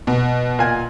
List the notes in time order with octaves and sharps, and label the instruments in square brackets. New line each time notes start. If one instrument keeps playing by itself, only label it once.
[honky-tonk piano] B2
[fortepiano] A#2 G#5